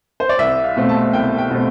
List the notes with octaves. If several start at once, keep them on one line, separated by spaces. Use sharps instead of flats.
C5
D5
C2 E5
F5
B2 A3 C4
A5
C2 G5
G5
B2 A3 C4